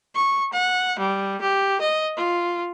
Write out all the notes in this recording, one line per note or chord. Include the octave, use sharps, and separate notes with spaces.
C#6
F#5
G3
G4
D#5
F4